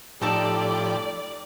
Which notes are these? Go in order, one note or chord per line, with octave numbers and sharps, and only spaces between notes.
A2 F3 D#4 G4 A4 D5 A5